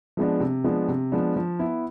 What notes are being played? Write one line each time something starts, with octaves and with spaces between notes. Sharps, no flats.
F3 G#3 B3 D4
C3
F3 G#3 B3 D4
C3
F3 G#3 B3 D4
F3
B3 E4